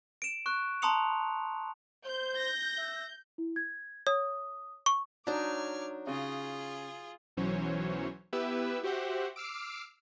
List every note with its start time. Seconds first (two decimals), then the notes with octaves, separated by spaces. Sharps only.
0.22 D7 E7
0.46 C#6 F#6
0.82 A5 A#5 C6 D#6 C#7 F7
2.06 C5 G6
2.36 A#6
2.78 E5
3.38 E4
3.56 G#6
4.07 C#5 D#6
4.86 C#6
5.27 F#3 D4 D#4 D6 F6 G#6
6.07 C#3 F4 G#4
7.37 B1 E3 F#3 C#4 C5 C#5
8.33 B3 E4 G4 B4 E5 E6
8.83 F#4 G4 C5 E5 F#5
9.36 D6 E6 F6 C7 D7